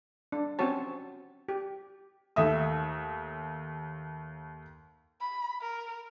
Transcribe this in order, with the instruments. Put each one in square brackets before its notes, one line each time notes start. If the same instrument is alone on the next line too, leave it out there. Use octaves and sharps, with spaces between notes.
[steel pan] D4
C4 C#4 F#4 C#5 A5
G4
[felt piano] D#2 A3 E5 D#6
[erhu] B5
A#4